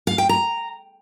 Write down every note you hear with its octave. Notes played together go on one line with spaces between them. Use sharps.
F5
G5
A#5